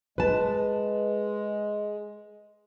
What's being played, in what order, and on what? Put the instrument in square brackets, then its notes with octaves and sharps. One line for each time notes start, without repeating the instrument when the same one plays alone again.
[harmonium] G#3 [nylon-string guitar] B4 A5